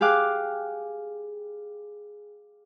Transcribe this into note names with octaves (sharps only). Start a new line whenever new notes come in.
G4 G#4 F5 D6 F#6